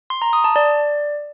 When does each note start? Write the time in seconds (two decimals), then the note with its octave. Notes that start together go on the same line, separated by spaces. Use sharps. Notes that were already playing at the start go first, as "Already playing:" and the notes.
0.10 C6
0.22 A#5
0.33 D#6
0.44 A5
0.56 D5